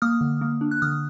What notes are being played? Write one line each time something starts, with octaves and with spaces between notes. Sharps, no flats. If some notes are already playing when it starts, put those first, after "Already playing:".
A#3 D#6 F6
D3
A#3
D4
F#6
D3 D#6 F6